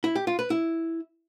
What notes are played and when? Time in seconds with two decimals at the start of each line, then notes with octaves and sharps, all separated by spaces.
0.04 E4
0.16 G4
0.27 F4
0.39 B4
0.50 E4